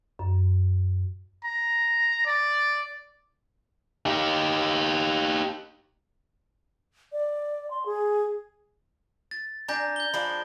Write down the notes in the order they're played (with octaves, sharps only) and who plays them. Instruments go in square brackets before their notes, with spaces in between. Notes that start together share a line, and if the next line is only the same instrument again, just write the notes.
[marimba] F#2
[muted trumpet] A#5
D5
[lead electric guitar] D#4 G4
[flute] D5
C6
G#4
[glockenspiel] A6
[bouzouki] D4 G#5 [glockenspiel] A#5 G6 A#6
[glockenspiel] G6 G7
[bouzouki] F3 D4 G#4 [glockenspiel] B5